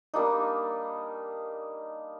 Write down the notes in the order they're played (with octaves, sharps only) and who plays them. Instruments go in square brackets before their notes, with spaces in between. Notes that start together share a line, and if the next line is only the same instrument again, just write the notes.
[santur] G3 A#3 D4 D#4